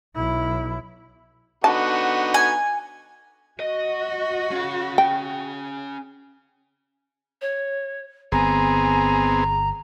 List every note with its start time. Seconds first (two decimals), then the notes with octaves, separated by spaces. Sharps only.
0.15 B1 E4
1.64 D3 B3 D#4 F#4 A5
2.34 G#5
3.60 F#4 D#5
4.51 C#4 F5
4.98 G5
7.41 C#5
8.32 G1 B3 C4 G#4 G#5 A#5